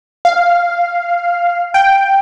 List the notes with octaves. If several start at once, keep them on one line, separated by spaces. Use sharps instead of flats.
F5
G5